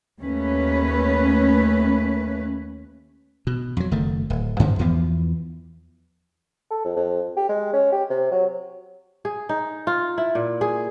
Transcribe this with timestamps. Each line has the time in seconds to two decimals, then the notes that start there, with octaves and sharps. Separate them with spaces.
0.20 D#2 A3 C#4 B4
3.47 B2
3.77 F2 F#3
3.91 F#1 D#3 A3
4.30 D1
4.59 G2 D3 D#3
4.79 E2 E3 F3 B3
6.71 A4
6.85 F2
6.97 F2
7.37 G4
7.49 G#3
7.73 C#4
7.92 G4
8.10 C3
8.32 F#3
9.25 G#4
9.49 D#4
9.87 F4
10.18 E4
10.35 A#2
10.61 G#4